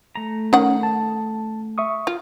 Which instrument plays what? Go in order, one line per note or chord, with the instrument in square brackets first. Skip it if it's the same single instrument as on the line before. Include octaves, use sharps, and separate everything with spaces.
[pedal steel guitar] A3 A#5
[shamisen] D#3 F#5 [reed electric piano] C#4
[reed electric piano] A5
E5 C#6 D#6
[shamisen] F4